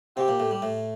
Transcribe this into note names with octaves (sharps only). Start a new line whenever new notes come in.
C3 C4 G4
A#2 A#3
A2 A3
G3
A2 A3